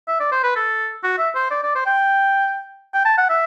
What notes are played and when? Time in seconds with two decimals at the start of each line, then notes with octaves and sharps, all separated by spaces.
0.08 E5
0.20 D5
0.32 C5
0.43 B4
0.56 A4
1.04 F#4
1.19 E5
1.35 C5
1.50 D5
1.63 D5
1.75 C5
1.86 G5
2.94 G5
3.05 A5
3.18 F#5
3.29 E5